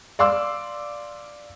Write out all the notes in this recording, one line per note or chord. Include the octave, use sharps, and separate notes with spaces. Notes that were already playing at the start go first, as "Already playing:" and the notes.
D5 F5 C6 D6 E6